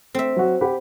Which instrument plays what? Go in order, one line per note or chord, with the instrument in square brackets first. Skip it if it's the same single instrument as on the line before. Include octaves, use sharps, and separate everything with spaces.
[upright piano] A3 [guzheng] C4 E5
[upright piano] F#3 F#4
G4 F#5 B5